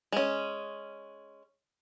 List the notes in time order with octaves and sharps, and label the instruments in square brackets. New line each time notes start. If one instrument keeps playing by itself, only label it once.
[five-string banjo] G#3 C#4